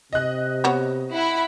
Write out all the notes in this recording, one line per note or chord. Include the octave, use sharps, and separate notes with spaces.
C3 D#5 F#6
B3 F#4 C#5
E4 F#5 B5